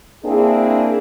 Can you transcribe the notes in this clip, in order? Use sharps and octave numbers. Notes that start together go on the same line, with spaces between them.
A#3 C4 D4 E4 G#4